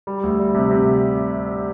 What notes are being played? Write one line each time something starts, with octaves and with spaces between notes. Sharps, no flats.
G3
D2
G3
C3
C3